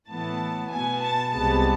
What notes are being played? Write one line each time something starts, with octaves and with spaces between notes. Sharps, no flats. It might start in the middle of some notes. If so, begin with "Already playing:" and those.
A2 E3 B3 A5
B2 B3 G#5
A5
C2 C3 G#3 B3 A5